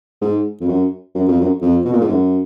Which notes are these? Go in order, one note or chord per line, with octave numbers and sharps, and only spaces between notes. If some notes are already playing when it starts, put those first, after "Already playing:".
G#2
F2
F#2
F#2
F2
F#2
F2
B2
A#2
G#2
F#2